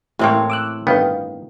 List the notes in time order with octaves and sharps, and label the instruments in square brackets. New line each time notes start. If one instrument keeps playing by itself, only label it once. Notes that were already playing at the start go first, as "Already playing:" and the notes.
[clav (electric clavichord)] A1 A#3 [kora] A2 C4 C#5
[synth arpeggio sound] D6 E6 F#6
[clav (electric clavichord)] G1 D#3 B3 [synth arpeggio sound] B4 F5 G5